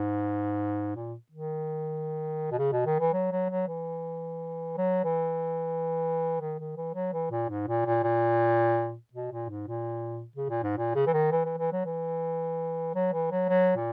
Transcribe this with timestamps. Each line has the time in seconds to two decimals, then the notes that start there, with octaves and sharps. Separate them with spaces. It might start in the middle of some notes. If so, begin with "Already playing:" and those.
Already playing: G#2
0.95 A#2
1.31 D#3
2.52 B2
2.58 C#3
2.72 B2
2.86 D#3
3.00 E3
3.13 F#3
3.31 F#3
3.50 F#3
3.68 E3
4.77 F#3
5.04 E3
6.40 D#3
6.59 D#3
6.77 E3
6.95 F#3
7.13 E3
7.31 A#2
7.49 G#2
7.68 A#2
7.86 A#2
8.03 A#2
9.13 B2
9.31 A#2
9.49 G#2
9.67 A#2
10.36 C#3
10.49 A#2
10.63 G#2
10.77 A#2
10.95 C#3
11.07 E3
11.13 D#3
11.31 E3
11.45 E3
11.58 E3
11.72 F#3
11.85 E3
12.95 F#3
13.13 E3
13.31 F#3
13.49 F#3
13.76 A#2